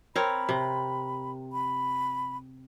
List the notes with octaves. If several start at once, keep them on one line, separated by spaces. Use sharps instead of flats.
C4 A#4 C#5 B5
C3
B5